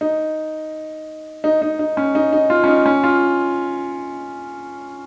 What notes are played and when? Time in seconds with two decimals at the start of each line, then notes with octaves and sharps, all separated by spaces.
0.01 D#4
1.44 D#4
1.62 D#4
1.79 D#4
1.97 C#4
2.15 D#4
2.32 D#4
2.50 F4
2.64 C#4
2.68 D#4
2.86 C#4
3.04 F4